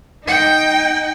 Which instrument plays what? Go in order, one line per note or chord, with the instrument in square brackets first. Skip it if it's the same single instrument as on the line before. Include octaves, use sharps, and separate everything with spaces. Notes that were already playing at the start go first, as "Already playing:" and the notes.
[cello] D#4 G5